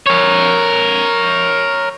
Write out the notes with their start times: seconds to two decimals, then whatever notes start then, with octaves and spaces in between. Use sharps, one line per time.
0.06 A#4 C#5